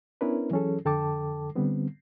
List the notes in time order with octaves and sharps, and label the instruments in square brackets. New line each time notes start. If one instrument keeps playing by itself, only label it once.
[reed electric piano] B3 C#4 D4 E4 A#4 B4
E3 F#3 C#4 G#4 A4
F2 D3 A4 G5 A5 D6
D3 G3 B3 C4